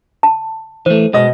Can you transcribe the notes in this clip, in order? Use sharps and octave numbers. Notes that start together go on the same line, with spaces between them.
A5
E3 A3 C5
B2 G#3 D#5